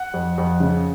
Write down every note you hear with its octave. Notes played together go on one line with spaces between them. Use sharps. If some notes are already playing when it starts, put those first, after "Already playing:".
Already playing: F#5
F2
F2
C#3